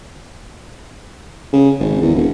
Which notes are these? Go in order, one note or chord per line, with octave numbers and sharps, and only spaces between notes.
C#3
G#1
E2
E1